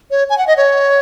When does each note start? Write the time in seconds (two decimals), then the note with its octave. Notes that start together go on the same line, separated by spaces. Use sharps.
0.11 C#5
0.30 G#5
0.38 F#5
0.47 D#5
0.57 C#5